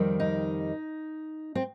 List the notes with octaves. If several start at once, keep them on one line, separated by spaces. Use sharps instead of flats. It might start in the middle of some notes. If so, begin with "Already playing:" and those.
Already playing: F2 D#3 G3
D#4
C4